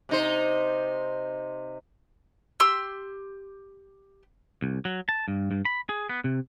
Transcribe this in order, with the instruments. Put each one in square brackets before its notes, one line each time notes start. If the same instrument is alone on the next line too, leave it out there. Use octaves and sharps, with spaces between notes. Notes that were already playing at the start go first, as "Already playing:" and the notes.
[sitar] C3 D#4 C5
[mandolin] G4 C6 E6
[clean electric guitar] C2
F#3
A5
G2
G2
B5
G#4
B3
C3